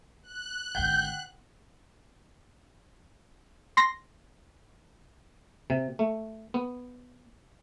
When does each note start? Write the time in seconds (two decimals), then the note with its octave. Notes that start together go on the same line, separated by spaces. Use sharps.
0.23 F#6
0.75 G#1 D3 F#5 G5 G6
3.77 C6 A#6
5.70 C3
5.99 A3
6.54 B3